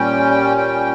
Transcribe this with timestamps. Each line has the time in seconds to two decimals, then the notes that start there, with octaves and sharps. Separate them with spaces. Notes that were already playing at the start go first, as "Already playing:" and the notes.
Already playing: A#2 G3 C#4 G5
0.58 G5